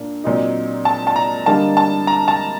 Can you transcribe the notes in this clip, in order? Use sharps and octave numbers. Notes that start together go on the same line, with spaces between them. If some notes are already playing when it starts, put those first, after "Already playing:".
Already playing: A#2 A#3 D4
A#2 F#3 C4 D#4
A5
A5
A#5
D3 G3 A#3 D#4 A5
A5
A#5
A5